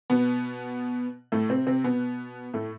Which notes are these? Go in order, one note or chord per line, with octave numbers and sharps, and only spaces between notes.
B2 B3
A2 A3
C3 C4
C3 C4
B2 B3
A2 A3